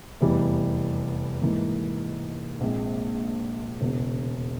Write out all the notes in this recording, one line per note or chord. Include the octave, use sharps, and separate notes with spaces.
F1 E2 E3 G3
G#2 E3 A#3
A#1 A#2 G#3 C4
E1 E2 C#3